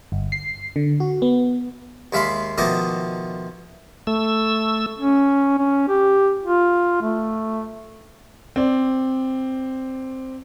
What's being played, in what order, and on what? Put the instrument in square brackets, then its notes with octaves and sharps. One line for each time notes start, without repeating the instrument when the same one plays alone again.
[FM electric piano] G1
C7
D3
F#4
B3
[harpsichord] D#2 G#3 E5 F5 B5 C6
B2 D#3 F3 A3 D#5 D6
[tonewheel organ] A3 E6
[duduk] C#4
C#4
G4
F4
A3
[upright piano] C4 D5